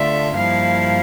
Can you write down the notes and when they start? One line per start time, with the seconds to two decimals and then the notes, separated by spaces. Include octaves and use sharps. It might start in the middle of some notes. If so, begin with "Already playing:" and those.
Already playing: D3 A3 D4 F4 E5
0.36 G2 F3 A#3 E4 F5